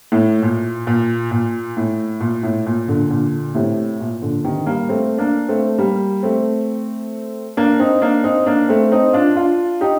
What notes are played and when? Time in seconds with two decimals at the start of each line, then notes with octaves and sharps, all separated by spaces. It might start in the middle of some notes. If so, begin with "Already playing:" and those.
0.12 A2
0.42 A#2
0.87 A#2
1.31 A#2
1.77 A2
2.20 A#2
2.43 A2
2.66 A#2
2.88 A#2 D3
3.10 A#2 D3
3.55 A2 C3
4.00 A#2
4.22 A#2 D3
4.44 C3 D#3
4.67 G3 A#3
4.89 A3 C4
5.18 A#3 D4
5.48 A3 C4
5.79 G3 A#3
6.23 A3 C4
7.57 A#3 D4
7.79 C4 D#4
8.02 A#3 D4
8.24 C4 D#4
8.47 A#3 D4
8.69 A3 C4
8.92 C4 D#4
9.13 D4 F4
9.36 D4 F4
9.81 D#4 G4